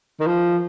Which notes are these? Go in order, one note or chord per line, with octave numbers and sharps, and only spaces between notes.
D#3
F3